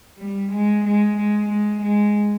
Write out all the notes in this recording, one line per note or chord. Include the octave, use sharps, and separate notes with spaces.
G3
G#3
G#3
G#3
G#3
G#3